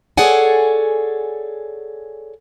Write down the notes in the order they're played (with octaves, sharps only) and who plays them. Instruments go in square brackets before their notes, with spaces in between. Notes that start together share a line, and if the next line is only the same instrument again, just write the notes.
[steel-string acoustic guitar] G#4 A4 C#5 D5 F#5 G#5